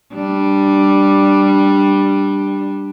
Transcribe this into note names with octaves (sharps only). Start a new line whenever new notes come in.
G3 D4